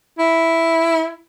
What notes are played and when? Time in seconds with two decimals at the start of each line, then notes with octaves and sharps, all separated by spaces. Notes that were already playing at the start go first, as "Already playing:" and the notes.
0.19 E4